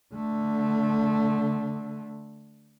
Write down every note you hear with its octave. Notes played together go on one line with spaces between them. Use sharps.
D3 A3